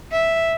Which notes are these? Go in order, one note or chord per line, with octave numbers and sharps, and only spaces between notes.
E5